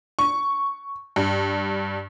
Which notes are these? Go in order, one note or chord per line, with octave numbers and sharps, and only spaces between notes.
C#6
G2